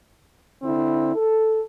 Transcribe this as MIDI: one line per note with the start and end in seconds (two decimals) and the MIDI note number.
0.63 1.14 50
0.63 1.14 60
0.63 1.14 64
1.15 1.60 69